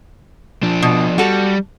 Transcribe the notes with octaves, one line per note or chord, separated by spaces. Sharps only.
F3 D4
B2
G3 F#4 A4